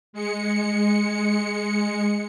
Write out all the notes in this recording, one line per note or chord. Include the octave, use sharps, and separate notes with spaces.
G#3 C#7